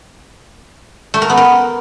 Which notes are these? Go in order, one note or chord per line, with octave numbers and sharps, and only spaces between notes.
A3
A#4
B3
A#4